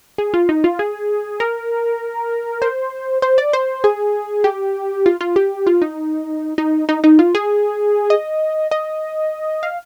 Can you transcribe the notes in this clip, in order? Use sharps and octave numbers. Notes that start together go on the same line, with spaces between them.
G#4
F4
D#4
F4
G#4
A#4
C5
C5
D5
C5
G#4
G4
F4
F4
G4
F4
D#4
D#4
D#4
D#4
F4
G#4
D#5
D#5
F5